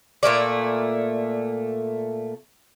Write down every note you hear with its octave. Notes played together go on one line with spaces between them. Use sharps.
A#2 A3 A#3 D5